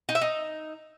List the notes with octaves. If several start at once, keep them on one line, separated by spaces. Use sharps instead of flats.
D#4
E5
D#4